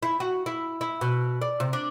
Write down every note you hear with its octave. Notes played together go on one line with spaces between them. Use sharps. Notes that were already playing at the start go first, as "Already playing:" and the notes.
E4
F#4
E4
E4
B2
D5
C3
D4